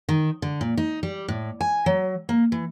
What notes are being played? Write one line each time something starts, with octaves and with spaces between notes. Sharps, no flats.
D#3
D3
A#2
D#4
G3
A2
G#5
F#3
A#3
E3